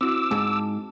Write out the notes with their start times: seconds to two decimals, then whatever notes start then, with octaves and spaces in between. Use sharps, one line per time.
0.01 C4 E4 F#4 D6 E6
0.31 G#2 A5